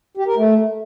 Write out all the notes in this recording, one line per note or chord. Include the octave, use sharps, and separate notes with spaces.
G4
A#4
A3